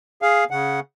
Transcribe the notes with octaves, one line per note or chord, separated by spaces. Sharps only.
G#4 F5
C#3 F#5